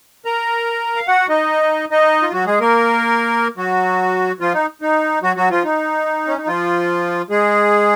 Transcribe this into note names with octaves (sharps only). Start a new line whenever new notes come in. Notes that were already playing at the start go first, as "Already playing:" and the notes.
A#4 A#5
F5
F#4 F#5
D#4 D#5
D#4 D#5
F4
F#3 F#4
G#3 G#4
A#3 A#4
F#3 F#4
F3 F4
D#4
D#4
F#3 F#4
F#3 F#4
F3 F4
D#4
C#4
D#4
F3 F4
G#3 G#4